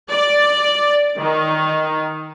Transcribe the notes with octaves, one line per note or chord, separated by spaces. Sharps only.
D5
D#3